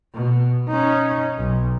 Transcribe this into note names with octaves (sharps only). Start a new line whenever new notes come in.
B2
C#4 D#4
B1